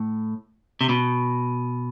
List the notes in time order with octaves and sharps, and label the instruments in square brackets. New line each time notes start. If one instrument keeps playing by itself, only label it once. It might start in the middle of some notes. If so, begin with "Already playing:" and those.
Already playing: [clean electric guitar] A2
C3
B2